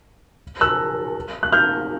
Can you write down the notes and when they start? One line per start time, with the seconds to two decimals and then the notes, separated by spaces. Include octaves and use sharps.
0.61 E6 F#6
1.43 F#6
1.52 F6 G6